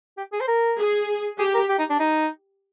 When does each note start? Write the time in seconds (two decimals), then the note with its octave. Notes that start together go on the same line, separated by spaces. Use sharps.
0.17 G4
0.32 G#4
0.40 C5
0.48 A#4
0.77 G#4
1.38 G4 G#4
1.54 A#4
1.69 G4
1.79 D#4
1.90 D4
2.00 D#4